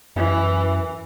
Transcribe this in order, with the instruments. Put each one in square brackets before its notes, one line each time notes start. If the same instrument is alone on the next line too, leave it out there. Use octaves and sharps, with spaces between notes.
[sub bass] F#2 [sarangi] E3